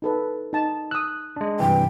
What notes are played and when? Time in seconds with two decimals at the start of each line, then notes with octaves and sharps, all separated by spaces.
0.02 D#4 A4 B4
0.53 D#4 A5
0.91 D#6 E6 F#6
1.36 G#3 D4
1.60 G2 C3 E3 G5